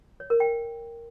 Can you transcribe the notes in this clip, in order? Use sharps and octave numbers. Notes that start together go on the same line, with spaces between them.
C#5
A#4
G5